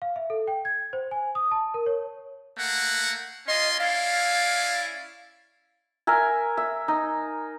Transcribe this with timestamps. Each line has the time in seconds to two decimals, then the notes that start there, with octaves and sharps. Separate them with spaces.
0.02 F5
0.16 E5
0.30 A4
0.48 G5
0.65 G#6
0.93 C5
1.11 G#5
1.35 D#6
1.51 A5
1.74 A#4
1.86 C#5
2.58 A3 A#3 F#5
3.47 C#4 F4 D#5 C6
3.79 C#4 E4 D5 F5
6.07 A#4 E5 G#5
6.57 E5
6.88 D#4